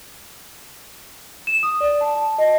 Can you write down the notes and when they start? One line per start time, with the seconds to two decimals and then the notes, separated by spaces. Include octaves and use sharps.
1.47 E7
1.63 D#6
1.81 D5
2.01 A5
2.15 A5
2.38 D#5